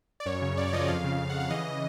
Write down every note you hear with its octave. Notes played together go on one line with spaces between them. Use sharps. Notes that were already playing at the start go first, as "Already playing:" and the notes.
D5
F#2 C#5
C#3
F#2 D5
D5
F3 D#5
F2 F5
C#3
C#3
F#5
C#3
F5
E3 D#5